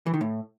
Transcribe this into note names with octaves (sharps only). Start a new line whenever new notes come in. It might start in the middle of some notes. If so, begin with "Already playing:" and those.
E3
D#3
A2